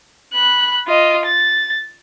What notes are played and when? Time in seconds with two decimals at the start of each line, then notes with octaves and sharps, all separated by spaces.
0.33 B5 F#6
0.87 F4 D#5
1.25 A6